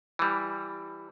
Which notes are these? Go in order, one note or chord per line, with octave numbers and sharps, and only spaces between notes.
E3 G3